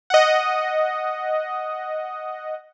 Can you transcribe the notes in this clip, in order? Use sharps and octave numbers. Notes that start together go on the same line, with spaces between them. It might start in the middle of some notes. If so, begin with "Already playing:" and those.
D#5 F#5